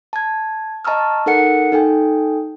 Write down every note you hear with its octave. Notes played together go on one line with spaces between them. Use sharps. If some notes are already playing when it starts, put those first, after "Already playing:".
A5 G#6
D#5 A5 A#5 C#6 E6 F6
D#4 A4 A#4 F#5 C#7
D#4 A4 G5 G#5